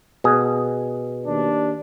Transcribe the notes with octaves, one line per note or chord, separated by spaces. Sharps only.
B2 G#4
D#2 D4